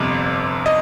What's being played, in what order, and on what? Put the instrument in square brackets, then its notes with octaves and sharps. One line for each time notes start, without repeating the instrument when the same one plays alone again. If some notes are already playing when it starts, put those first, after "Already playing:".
Already playing: [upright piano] G1 F2 C3
D#5